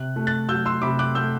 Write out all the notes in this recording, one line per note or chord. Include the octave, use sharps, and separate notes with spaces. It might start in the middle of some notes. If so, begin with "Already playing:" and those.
Already playing: C3 F#6
A3
F#6 A6
F#3 E6 G6
C6 E6
C3 B5 D6
D6 F#6
A3 E6 G6